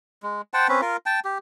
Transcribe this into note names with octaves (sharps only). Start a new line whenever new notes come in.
G#3
C5 F#5 G5 A5
C4 C#4 B4
F4 A#4
G5 A5
G4